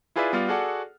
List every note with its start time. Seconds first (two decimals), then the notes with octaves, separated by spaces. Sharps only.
0.16 E4 F4 G#4 B4 D5 E5
0.33 G3 B3 F4 D5 F6
0.49 F#4 G#4 A4 D5 F#5